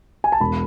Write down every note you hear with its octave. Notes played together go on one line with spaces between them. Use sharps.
G#5
A5
E1 B5